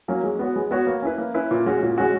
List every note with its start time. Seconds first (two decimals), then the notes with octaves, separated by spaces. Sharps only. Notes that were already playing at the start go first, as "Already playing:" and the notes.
0.08 F#3 A#3 C#4
0.24 G#3
0.39 B3 F#4 C#5
0.56 G#3
0.71 B3 F#4 C#5
0.87 A#3
1.02 C#4 E4 B4
1.18 A#3
1.34 C#4 E4 B4
1.51 A#2
1.66 G#3 C#4 F#4
1.83 A#2
1.98 G#3 C#4 F#4